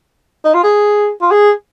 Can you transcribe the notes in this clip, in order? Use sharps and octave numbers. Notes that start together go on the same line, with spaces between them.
D#4
F4
G#4
F4
G#4